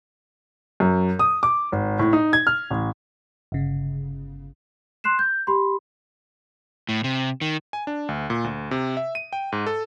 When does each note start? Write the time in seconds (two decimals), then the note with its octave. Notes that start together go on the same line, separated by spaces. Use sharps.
0.80 F#2
1.19 D#6
1.43 D6
1.72 G#1
1.99 A2
2.13 D#4
2.33 G#6
2.47 F6
2.71 A1
3.52 G1 C#3
5.04 C6 F#6 C7 E7
5.19 G6
5.47 G4 B5 C6
6.89 A2
7.04 C3
7.41 D#3
7.73 G#5
7.87 D4
8.09 D2
8.30 A#2
8.44 D2
8.71 C3
8.97 E5
9.15 D#7
9.33 G5
9.52 G#2
9.67 A4